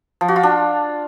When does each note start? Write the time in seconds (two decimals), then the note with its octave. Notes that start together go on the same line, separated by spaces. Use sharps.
0.21 F3
0.28 F#4
0.36 F4
0.43 D4